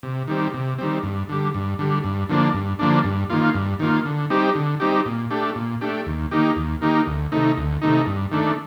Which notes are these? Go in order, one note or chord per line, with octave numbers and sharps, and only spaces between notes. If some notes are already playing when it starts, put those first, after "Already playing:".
C3
D#3 G3 C4
C3
D#3 G3 C4
G2
D3 G3
G2
D3 G3
G2
D3 F3 A#3 D4
G2
D3 F3 A#3 D4
G2
D#3 A#3 F4
G2
D#3 A#3 F4
D3
G3 C4 D#4 G4
D3
G3 C4 D#4 G4
A#2
A3 D4 G4
A#2
A3 D4 G4
D#2
D#3 A#3 D#4 G4
D#2
D#3 A#3 D#4 G4
D2
C3 D#3 A3 D#4
D2
C3 D#3 A3 D#4
G2
D#3 A3 D4